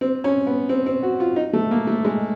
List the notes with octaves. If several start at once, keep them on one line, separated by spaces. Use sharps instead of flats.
C4
C#4
B3
C4
C4
F#4
F4
D#4
A3
A#3
A3
G#3